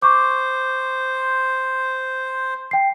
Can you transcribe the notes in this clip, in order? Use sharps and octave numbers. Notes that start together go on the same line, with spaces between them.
C5 C#6 D6
G5 C7